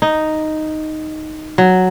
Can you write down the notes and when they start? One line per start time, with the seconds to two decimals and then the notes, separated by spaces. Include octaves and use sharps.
0.02 D#4
1.58 F#3